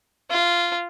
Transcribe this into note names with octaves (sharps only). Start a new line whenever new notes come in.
F4